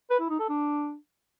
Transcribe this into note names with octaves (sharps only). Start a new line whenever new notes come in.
B4
E4
D#4
A4
D4